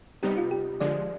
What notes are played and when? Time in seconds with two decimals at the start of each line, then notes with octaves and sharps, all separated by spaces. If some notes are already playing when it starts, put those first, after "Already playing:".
0.23 C3 G3 B3 D#4 G4
0.37 F4
0.51 G4
0.80 D3 F3 G#3 D5